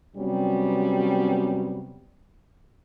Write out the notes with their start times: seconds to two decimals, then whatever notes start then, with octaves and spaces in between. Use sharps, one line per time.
0.17 C3 F#3 G3 B3 C#4